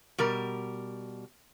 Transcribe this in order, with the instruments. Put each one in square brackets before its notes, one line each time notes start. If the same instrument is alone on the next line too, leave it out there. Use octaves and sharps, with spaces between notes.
[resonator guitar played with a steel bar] B2 G3 A#4